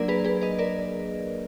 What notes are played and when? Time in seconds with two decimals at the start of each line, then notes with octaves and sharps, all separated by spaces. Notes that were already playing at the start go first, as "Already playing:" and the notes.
Already playing: F#3 A#3 D4 A#4 D5
0.08 G#4 B4
0.25 G#4 B4
0.42 B4 D#5
0.59 A#4 D5